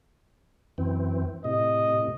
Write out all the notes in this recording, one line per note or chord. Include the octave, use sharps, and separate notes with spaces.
F#2 E3 C4
A2 C3 D#5